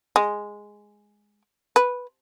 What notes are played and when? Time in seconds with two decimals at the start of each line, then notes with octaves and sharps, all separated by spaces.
0.16 G#3
1.76 B4